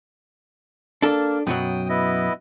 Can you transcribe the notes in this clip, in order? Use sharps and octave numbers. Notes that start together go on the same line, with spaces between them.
A#3 D4 A4
F#2 B2 F#3 G5 D#6
B3 E4 D#5